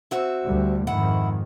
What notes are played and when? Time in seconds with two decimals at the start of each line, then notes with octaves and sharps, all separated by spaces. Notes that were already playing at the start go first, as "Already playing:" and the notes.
0.11 C4 F#4 E5
0.46 D2 G3
0.87 F2 G#2 D#3 E4 F#5